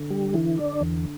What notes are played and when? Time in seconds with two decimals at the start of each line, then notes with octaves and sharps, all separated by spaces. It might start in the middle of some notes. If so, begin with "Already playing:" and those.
Already playing: D3
0.10 G3
0.34 E3
0.58 D4
0.81 E2